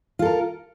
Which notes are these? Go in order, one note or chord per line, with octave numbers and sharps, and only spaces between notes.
F4 A4 A#4